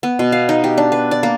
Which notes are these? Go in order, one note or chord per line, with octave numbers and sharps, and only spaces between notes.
B3
B2
F5
D#4
G4
D4
B4
D5
A#3